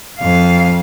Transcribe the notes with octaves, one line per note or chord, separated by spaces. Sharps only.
F2 F5